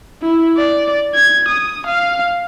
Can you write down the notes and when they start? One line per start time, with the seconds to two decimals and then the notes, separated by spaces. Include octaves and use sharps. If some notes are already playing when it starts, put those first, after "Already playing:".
0.22 E4
0.57 D5
1.14 G#6
1.48 D#6
1.87 F5